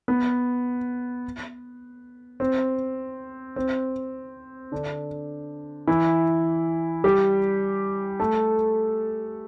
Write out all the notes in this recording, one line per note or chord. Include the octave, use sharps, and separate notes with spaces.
B3
C4
C4
D3 D4
E3 E4
G3 G4
A3 A4